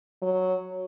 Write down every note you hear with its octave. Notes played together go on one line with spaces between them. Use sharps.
F#3